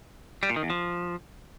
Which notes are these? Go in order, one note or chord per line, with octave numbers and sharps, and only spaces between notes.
G3
A#2
D#3
E2
F3